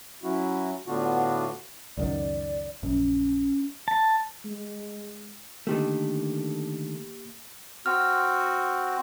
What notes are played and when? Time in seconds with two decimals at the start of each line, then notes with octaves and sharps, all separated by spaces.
0.23 F#3 C#4 E4 F#4
0.87 A2 D3 B3 D4 F4 F#4
1.98 C#2 F#2 D#3 D5
2.83 A#1 F#2 C#4
3.88 A5
4.45 G#3
5.67 D3 D#3 A3 A#3 G4
7.86 C4 F#4 F6